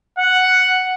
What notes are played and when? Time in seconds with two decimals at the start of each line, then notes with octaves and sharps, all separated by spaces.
0.18 F#5